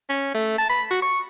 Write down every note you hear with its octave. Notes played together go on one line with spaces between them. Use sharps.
C#4
A3
A5
B5
F#4
C#6